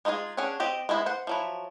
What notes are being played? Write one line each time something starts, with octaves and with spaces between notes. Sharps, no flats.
G#3 D#4 F4 F#4 G#4
C#4 D4 G#4 F#5
C4 G4 D#5
G#3 B3 E4 C5
C5 F#5
F3 F#3 E4